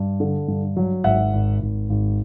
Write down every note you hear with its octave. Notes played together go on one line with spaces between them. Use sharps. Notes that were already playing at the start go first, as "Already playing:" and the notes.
Already playing: G2
D3
G2
F#3
G#1 E5 F#5
G#1
G#1
G#1